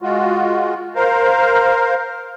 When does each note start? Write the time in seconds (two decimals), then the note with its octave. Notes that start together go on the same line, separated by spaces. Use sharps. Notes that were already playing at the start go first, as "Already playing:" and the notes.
0.02 G#3 F4 F#4
0.95 A#4 C5 F5